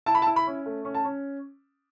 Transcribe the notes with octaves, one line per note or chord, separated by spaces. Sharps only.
E4 A5
B5
A5
E4
B5
C#4
A3
C#4
A5
C#4